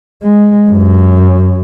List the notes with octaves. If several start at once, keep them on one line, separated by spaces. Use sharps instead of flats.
G#3
F#2